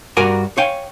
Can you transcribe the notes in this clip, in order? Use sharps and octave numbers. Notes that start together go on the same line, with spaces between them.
G2 F#4 A#4 D5 G#5 A#5
C#5 F5 G5 G#5